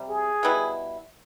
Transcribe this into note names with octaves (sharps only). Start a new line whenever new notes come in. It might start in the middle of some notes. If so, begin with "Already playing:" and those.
Already playing: C3 G3
G#4
B2 G3 B3 E4